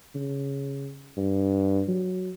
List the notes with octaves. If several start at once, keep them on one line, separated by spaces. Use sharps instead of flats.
C#3
G2
F#3